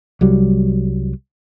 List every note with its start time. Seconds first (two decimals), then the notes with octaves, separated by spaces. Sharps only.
0.21 C2 F#3 G3